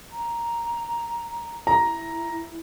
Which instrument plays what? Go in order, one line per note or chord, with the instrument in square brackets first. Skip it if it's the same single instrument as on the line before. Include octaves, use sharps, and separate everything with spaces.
[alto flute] A#5
[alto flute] E4 [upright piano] A#5